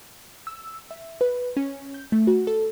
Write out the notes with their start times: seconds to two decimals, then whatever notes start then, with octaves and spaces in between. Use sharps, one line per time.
0.47 E6
0.91 E5
1.21 B4
1.57 C#4
1.94 G6
2.12 A3
2.27 F#4
2.47 A4